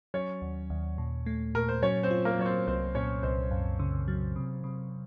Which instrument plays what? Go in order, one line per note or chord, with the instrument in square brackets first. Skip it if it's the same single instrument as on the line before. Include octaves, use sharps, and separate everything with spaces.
[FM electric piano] F#3 [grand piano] C#4 C#5
[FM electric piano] D#2
D#2
A#2
A3
[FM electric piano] A#2 [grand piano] A#4
[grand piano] C5
[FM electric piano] F#3 [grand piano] C#4 C#5
[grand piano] C4 C5
[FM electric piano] F4
[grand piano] A#3 A#4
[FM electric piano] F#3 [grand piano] C#5
[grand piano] C4 C5
[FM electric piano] C2 [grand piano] C4 C5
[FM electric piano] A#2 [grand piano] C#4 C#5
[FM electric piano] C2 [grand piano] C4 C5
[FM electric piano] F#2
C#3
F#3
C3
C3